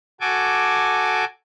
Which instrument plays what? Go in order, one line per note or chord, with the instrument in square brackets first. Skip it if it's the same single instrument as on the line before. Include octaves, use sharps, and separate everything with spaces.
[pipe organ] F#4 A4 G#5 D6